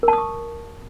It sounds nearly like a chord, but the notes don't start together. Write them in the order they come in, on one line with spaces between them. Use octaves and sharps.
A#4 A5 D#6 C#6